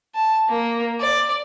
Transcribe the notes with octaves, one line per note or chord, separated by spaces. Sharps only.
A5
A#3
D5